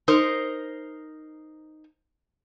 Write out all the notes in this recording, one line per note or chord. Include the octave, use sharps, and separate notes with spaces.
D#4 A#4 C5